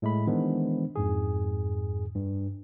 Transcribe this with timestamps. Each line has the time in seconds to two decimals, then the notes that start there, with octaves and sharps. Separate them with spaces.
0.02 A2 G#3 A3 B5
0.27 D#3 E3 G#3 B3 D4 C5
0.96 F2 G#2 G#4
2.15 G2